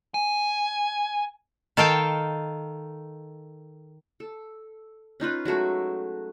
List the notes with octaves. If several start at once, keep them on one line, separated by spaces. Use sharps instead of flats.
G#5
D#3 A4 F5 G5
A4
C#4 D#4 F4 B4
F#3 G#3 A3 F#4